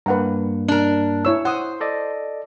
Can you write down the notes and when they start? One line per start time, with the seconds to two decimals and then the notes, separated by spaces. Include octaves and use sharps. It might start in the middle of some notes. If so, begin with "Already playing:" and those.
0.06 G2 A#3 B4 F#5 A#5
0.68 D4 A#4
1.25 E4 C#5 E6
1.45 C5 F#5 D#6
1.81 A4 D5 D#5